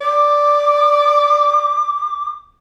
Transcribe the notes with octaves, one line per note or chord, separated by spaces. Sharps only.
D5 D6